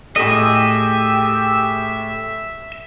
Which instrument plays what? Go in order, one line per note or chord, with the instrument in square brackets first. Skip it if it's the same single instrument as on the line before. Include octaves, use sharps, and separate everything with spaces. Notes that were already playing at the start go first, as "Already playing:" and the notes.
[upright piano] A2 A3 [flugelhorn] G4 [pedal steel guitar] G#4 D#5 [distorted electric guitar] E5